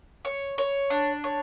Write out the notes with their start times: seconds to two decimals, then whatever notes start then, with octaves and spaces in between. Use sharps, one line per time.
0.25 C#5
0.58 C#5
0.90 D4
1.24 C#5